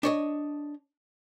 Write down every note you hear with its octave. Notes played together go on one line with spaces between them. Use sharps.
D4 C#5 D#5